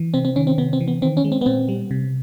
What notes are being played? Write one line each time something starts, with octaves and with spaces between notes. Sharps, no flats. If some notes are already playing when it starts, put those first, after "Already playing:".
Already playing: E3
C3 C4
C4
D#3 C#4
C4
C3 B3
C4
E3
B3
D#3 C4
C#4
G#3
C4
B3
A#2 C4
G3
C3